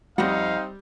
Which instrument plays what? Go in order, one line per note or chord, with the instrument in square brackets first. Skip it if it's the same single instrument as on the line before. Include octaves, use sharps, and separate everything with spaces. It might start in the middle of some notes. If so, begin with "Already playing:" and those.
[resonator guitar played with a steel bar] F2 F#5 [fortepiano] G3 [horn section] C4 D#4 [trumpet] F5